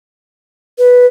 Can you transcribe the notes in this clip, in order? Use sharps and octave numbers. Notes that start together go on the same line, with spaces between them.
B4